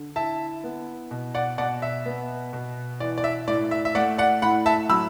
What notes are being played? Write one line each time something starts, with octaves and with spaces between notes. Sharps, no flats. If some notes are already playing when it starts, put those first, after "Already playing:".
Already playing: D3
E4 E5 A5
B3
B2
D5 F#5
B2 D5 F#5
E5
B3
B2
E3 D5
D5
E5
A2 D5
E5
E5
A3 D5 F#5
D5 F#5
A2 F#5 B5
E5 A5
F#3 B5 E6